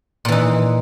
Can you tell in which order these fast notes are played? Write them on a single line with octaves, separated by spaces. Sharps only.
A#2 E3 D#4